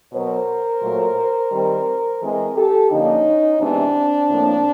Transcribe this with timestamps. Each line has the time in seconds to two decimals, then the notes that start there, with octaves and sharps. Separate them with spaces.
0.12 B2 F#3 B3 A#4 C5
0.82 A#2 F#3 A3
1.52 D#3 G3 C4
2.21 E3 G#3 C4 G#4 A#4
2.56 G4 A4
2.90 D3 F3 A#3 C#4 D#4
3.59 C3 E3 G#3 B3 C4 D4
4.29 A2 F3 A#3